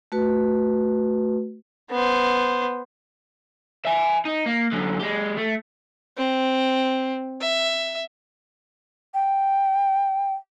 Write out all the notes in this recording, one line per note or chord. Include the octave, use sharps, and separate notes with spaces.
A3 F#4 B4
B3 C5
E5 G#5
D#4
A#3
F#2 D3
G#3 G4
A3
C4
E5
G5